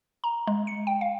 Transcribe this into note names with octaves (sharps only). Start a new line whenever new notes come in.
A#5
G#3
C#7
G5
F5